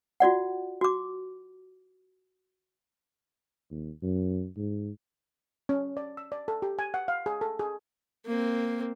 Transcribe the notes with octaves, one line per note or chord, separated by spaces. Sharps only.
F4 F#4 D5 F#5
F#4 D6
D#2
F#2
G#2
C#4
D5
E6
D5
A4
G4
G#5
F#5
F5
G#4
A4
G#4
A#3 C4